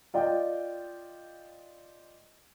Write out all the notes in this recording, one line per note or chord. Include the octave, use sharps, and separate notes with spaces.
F4 D5 D#5 G5